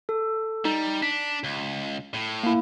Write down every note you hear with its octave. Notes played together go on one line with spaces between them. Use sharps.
A4
G3 D#4
D4 B6
C#2
A2
A#3 E4